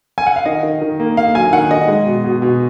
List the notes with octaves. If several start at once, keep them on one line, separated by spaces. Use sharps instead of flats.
G#5
F#5
F5
D#3 D#5
D#3
D#3
A#3
A#3 F5
F#3 G#5
D#3 F#5
D#3 D#5
G#3
B2
B2
B2